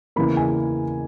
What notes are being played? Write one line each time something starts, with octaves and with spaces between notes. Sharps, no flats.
E2 C#3 E3 A#3 B5
G#5